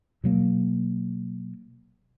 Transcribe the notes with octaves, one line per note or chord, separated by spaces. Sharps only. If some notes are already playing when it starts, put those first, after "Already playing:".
B2 F#3 A#3